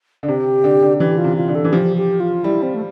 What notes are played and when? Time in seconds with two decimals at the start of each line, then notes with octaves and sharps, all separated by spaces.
0.23 D3
0.28 C3 G4
0.64 D3
0.82 D3
1.00 E3 G4
1.18 F4
1.24 C3
1.37 F4
1.48 D3
1.55 A4
1.64 E3
1.72 F3 G4
1.97 G4
2.20 F4
2.44 G3 E4
2.62 C4
2.75 A3